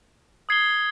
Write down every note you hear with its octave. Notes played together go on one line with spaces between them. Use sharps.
D#6 G#6 C7 G7